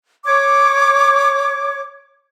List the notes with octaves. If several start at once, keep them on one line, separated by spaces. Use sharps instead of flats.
C#5 D6